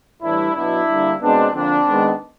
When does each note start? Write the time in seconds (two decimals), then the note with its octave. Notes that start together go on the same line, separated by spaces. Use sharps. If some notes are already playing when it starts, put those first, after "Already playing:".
0.23 A2 E3 G3 D4 E4
0.55 B2 F#3 B3 D4 E4
0.89 D3 G3 A#3
1.21 B2 G#3 B3 C4 D4
1.54 D3 F3 A#3 C4 D4
1.87 D#3 G#3 B3